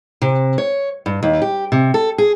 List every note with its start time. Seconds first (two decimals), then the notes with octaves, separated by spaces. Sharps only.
0.22 C3
0.58 C#5
1.06 G2
1.23 D#2
1.42 G4
1.72 C3
1.94 A4
2.18 G#4